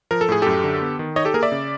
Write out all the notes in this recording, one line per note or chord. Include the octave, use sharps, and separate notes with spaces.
F3 A#4
A4
A2 G#4
F#2 G4 A4
D3
B3
D#3
D#4 C#5 D#5
G4 A4
A#3 G#4 A#4
D5 E5
C#3